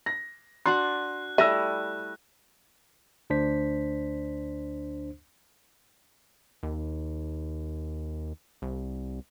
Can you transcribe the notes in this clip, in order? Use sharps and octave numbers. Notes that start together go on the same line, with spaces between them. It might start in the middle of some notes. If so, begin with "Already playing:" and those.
A#6
D4 F#4 F#5 C6 F#6
G3 A3 E4 E5 E6 A#6 D#7
D2 D4 C5 B6
D#2
C2